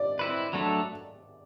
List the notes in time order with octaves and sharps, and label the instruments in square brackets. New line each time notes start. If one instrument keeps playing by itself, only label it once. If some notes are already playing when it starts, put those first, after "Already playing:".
Already playing: [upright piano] D5
[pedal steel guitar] C4 E4 B4
F#3 A3 D4 A4